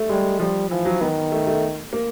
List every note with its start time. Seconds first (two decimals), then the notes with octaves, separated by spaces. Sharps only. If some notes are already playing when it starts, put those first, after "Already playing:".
Already playing: A3
0.09 G3 G#3
0.40 F3 G3
0.70 E3 F3
0.85 F#3
1.01 D#3 B3
1.32 A3
1.47 A3
1.93 A#3